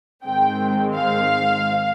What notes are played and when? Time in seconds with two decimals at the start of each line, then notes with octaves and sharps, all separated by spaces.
0.25 G#2 D#3 G#3 C4 G5
0.95 F5